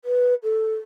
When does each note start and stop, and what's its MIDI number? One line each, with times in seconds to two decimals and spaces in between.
0.04 0.34 71
0.43 0.75 69